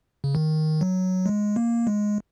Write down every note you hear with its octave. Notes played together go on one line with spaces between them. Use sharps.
C#3
D#3
F#3
G#3
A#3
G#3